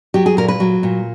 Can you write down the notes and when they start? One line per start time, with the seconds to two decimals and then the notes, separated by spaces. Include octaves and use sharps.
0.14 F#3 G4
0.26 G#4
0.37 A#2 A#4
0.48 B4
0.60 F#3
0.83 A#2